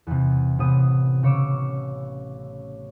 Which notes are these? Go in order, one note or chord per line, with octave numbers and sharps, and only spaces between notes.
E2 C3
A1 C3 B3 D#6
C#3 C#5 D6 E6